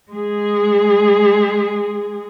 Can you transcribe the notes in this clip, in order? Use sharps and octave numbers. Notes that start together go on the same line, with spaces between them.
G#3 G#4